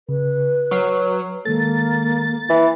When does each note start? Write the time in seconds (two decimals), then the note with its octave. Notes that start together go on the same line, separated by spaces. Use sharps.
0.09 C#3 B4
0.71 F#3 C#6 F6 C7
1.45 D#3 G#3 A#3 A4 A6
2.49 E3 E4